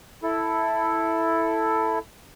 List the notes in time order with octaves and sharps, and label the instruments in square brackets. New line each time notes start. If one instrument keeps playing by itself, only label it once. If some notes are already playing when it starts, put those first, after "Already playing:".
[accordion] E4 A4